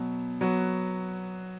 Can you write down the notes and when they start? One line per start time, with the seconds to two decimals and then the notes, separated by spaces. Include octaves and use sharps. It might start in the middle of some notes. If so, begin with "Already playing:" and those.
Already playing: B2 F#3
0.41 F#3 B3 F#4